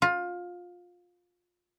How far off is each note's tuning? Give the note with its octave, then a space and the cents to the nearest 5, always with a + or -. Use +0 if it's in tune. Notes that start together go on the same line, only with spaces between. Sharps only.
F4 +20